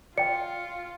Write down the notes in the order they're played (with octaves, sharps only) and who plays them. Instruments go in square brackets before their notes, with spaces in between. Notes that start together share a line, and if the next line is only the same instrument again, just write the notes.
[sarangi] F4 [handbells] D5 G5 [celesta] C#7